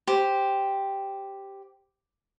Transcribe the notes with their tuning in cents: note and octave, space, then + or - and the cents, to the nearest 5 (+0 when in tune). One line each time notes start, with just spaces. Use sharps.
G4 +0 C5 +0